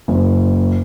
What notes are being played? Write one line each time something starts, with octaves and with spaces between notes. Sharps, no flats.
F#1